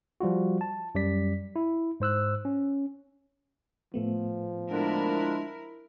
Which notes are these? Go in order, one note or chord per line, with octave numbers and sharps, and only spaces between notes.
F3 G3 F4 F#4
A5
F#2 G3 D5 B6
E4
G#2 C5 E6 F#6
C#4
A2 F3 A3 B3
D3 G#3 D4 E4 A#4